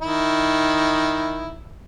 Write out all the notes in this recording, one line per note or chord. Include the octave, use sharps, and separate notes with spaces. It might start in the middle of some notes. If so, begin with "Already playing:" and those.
D#3 E4